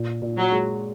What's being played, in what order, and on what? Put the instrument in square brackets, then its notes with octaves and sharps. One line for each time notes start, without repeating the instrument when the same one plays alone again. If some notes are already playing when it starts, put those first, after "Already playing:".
Already playing: [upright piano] A#2
A#2
[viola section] F#3
[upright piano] G#3